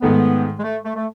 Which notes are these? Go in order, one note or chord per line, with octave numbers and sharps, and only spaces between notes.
G#2 D#3 A3 B3
G#3
A3
A3
A3